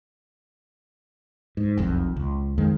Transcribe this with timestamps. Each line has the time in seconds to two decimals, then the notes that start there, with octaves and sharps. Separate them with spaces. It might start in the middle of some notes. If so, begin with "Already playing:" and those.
1.57 G#2
1.78 E1 B1 F2
2.16 C#2
2.58 F2 D#3 G#3